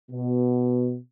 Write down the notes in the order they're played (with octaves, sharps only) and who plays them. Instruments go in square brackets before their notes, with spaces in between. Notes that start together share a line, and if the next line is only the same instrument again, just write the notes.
[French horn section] B2